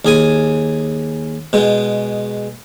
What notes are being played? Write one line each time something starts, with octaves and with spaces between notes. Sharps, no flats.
D#2 G#4 G#5
B2 G#3